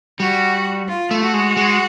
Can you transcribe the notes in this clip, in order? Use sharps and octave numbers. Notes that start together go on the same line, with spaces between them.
G3 F#4
F4
A3
F#4
G#3
G#3